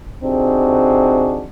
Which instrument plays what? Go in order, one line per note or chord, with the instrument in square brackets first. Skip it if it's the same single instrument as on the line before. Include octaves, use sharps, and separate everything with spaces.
[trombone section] C3 C4 D4 D#4 F#4 G#4